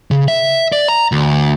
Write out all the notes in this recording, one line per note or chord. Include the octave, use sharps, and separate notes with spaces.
C#3
E5
D5
A#5
D2